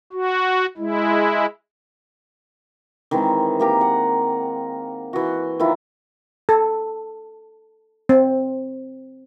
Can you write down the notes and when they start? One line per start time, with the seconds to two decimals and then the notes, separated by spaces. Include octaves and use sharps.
0.13 F#4
0.78 G#3 E4
3.11 D#3 E3 G#3 C4
3.60 A#3 G4 A#4
3.81 F#5
5.13 E3 F#4
5.60 D#3 F3 E4
6.49 A4
8.09 C4